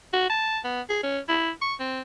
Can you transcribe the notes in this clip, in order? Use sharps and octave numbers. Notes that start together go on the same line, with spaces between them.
F#4
A5
B3
G#4
C#4
E4
C#6
C4